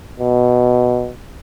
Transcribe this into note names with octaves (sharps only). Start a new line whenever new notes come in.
B2